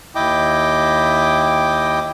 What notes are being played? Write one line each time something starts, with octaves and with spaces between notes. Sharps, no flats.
D#2 E4 D#5 G5 D6